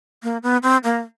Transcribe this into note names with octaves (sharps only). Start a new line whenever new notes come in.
A#3
B3
C4
A#3